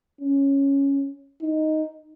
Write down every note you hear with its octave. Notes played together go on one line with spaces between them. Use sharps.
C#4
D#4